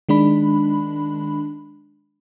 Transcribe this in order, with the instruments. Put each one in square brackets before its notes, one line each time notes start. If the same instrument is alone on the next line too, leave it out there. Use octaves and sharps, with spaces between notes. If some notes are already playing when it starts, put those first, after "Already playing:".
[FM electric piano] D#3 G#3 D4 B5